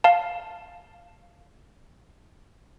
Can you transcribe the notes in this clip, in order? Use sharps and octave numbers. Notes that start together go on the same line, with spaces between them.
F5 A5